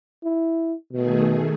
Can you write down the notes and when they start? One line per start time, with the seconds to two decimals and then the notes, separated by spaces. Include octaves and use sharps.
0.24 E4
0.92 B2 D#3 A3 G#4